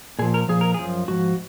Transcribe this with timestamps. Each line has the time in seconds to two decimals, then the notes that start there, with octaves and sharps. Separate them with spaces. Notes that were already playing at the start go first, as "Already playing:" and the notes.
0.19 A#2 G#4
0.22 F3
0.34 A#4
0.48 A#2 F3 G#4
0.61 A#4
0.74 F#2 F3 G#4
1.08 G#2 F3 F#4